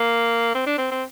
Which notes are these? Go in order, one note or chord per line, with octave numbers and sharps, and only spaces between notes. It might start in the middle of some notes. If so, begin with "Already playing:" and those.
Already playing: A#3
C4
D4
C4
C4